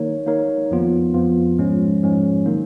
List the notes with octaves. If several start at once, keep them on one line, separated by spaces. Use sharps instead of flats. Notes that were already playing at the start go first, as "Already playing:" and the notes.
Already playing: D#3 A#3 D#4 A#4 C#5
D#3 A#3 D#4 A#4 C#5
F2 F3 B3 F4
F2 F3 B3 F4
G#2 F3 G#3 C#4
G#2 F3 G#3 C#4
D#3 F#3 A#3 D#4